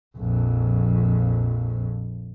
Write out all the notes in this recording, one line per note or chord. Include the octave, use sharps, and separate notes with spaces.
A#1 F2